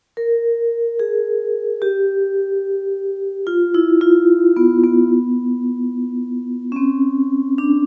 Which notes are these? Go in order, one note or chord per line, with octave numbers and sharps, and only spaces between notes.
A#4
G#4
G4
F4
E4
F4
B3
B3
C#4
C4
D4